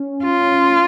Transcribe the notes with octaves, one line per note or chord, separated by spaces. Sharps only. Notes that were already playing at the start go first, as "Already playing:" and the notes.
Already playing: C#4
F4